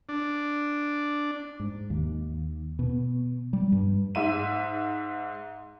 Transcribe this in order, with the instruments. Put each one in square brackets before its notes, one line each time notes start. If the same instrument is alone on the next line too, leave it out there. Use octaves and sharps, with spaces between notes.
[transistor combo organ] D4
[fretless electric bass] G#2
D#2
B2
G3
G2
[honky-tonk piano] G#2 E5 D#7